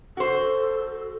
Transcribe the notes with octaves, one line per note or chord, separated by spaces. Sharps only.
F#4 A4 C5